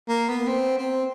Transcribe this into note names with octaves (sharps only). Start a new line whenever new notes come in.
A#3
B3
C4
C4